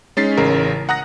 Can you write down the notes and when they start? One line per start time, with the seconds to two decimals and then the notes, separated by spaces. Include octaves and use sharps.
0.17 G#3 C#4 D#4 A6 B6 C7
0.37 A1 C#3 A#4
0.89 F#5 A#5 D#6 F#6 A#6